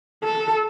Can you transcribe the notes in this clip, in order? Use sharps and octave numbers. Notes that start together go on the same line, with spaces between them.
A4